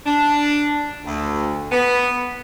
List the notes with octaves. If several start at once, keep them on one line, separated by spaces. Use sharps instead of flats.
D4
D2
B3